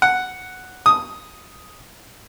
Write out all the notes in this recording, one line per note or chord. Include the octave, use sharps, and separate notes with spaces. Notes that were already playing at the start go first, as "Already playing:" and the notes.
F#5
D#6